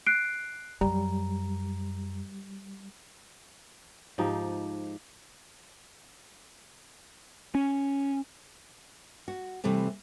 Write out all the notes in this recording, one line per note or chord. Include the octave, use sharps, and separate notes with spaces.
F#6 C7 D7
F#2 G3 A#5
G#2 F3 D#4 G4
C#4
F#4
C3 E3 G3 A3 C4